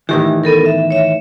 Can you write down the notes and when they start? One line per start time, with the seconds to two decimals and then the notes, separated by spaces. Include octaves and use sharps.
0.09 A2 D#3 E3 G4
0.44 B3 A4 A#4
0.66 E5
0.91 C#5 E5